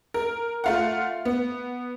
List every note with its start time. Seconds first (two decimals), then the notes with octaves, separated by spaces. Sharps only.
0.14 A#4
0.64 A3 F4 F#5
1.25 B3